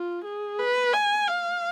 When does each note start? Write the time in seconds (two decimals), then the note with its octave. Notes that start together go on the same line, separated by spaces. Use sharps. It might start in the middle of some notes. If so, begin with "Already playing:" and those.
Already playing: F4
0.25 G#4
0.59 B4
0.93 G#5
1.28 F5